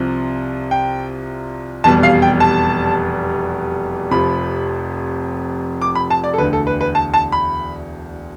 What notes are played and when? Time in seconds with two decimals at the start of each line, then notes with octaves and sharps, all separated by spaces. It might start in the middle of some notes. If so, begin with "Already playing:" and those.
Already playing: C2 C3 F3
0.71 G5
1.84 F1 E2 B2 G3 A5
2.03 F5
2.22 G5
2.40 A5
4.11 F1 F2 C3 F3 B5
5.82 D6
5.95 B5
6.10 A5
6.24 D5
6.34 A4
6.38 E1 D2 D3 B4
6.53 A4
6.67 B4
6.81 B4
6.95 A5
7.14 A5
7.32 B5